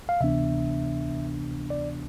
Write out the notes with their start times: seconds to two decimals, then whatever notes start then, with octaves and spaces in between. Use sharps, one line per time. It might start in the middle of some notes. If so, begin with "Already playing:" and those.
0.09 F5
0.20 D2 C3 E3 B3 D4 E5
1.70 D5